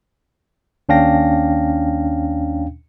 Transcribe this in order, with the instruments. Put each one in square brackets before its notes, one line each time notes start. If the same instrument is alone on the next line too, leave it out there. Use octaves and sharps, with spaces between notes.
[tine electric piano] D#2 C#4 D4 F5 G5 A#6